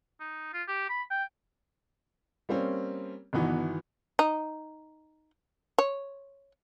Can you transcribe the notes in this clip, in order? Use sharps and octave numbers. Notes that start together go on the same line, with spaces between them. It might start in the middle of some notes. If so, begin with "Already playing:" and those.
D#4
F4
G4
B5
G5
G3 A#3 C4 C#4
G1 D#3 E3 B3 F#4
D#4
C#5